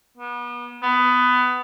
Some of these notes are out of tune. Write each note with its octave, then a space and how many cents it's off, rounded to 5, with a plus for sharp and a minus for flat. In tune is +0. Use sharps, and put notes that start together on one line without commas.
B3 -35
B3 +15